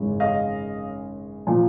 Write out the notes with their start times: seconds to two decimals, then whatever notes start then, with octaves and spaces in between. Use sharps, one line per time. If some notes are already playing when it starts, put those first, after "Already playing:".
Already playing: G#1 F#2 C#3 E3 G#3
0.20 D#5 F5
1.47 A#2 F3